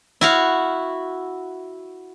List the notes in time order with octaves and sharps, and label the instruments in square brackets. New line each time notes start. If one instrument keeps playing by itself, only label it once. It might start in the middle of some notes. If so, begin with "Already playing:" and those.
[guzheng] E4 F#4 F5